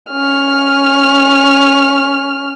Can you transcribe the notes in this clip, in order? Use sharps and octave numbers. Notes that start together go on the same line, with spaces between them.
C#4 F6